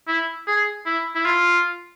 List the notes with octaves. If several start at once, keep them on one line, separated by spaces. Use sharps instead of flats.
E4
G#4
E4
E4
F4